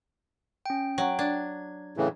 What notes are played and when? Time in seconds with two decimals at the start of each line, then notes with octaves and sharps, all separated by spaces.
0.66 C#4 G5
0.98 F#3 G5
1.19 D4 G#6
1.97 A2 C#3 E3